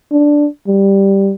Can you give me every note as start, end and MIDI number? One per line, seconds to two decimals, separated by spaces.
0.12 0.47 62
0.68 1.33 55